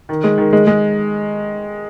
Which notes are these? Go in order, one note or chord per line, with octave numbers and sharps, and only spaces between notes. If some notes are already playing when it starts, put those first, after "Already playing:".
D#3
G#3
D#3
G#3
G#3